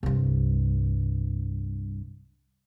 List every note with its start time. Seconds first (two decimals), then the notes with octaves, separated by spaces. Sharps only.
0.03 C2 G2